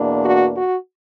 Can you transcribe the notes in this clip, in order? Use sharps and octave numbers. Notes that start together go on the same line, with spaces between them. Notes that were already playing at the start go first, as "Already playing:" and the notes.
Already playing: E2 B2 A#3 D4
F#4
F#4